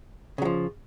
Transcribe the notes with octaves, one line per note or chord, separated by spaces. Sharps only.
C#3 F3 F#3